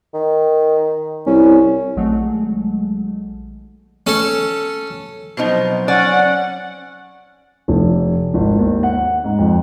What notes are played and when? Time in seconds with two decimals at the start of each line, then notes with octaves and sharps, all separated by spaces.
0.14 D#3
1.27 C2 C#4
1.96 A#1 D#3 F#3 G#3 A3
4.07 C#4 A4
5.37 B2 F3 F#3 C4 D#4 C5
5.88 C#4 D5 F#5 G#5
7.68 F1
8.34 G#1
8.59 D#2
8.83 F#5
9.24 G#2
9.39 F2